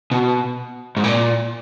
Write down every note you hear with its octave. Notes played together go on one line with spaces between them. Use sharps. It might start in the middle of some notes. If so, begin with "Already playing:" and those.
B2
G#2
A#2